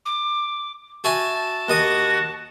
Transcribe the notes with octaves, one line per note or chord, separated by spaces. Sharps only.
D6
F#4 E5 G#5 A5
D#2 F#4 D#5 D#6